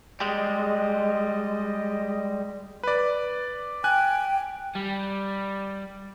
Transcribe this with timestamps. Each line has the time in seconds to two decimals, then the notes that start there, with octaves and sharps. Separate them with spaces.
0.20 G3 G#3 D#5
2.83 B4 D5
3.84 G5 G#5 F#6
4.75 G3